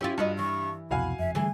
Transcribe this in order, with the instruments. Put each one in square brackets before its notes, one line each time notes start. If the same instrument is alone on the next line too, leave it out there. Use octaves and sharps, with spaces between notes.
[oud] C#4 E4 F4 [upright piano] G4
[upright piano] G2 [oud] F#4 B4 D#5
[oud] E3 [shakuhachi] C#6
[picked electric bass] C2 F2 B2 [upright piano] F#4 F5 G#5 [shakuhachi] B5
[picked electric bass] F#1 F2 [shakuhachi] E5
[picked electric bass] D3 G3 A3 [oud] E3 G#4 [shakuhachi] G#5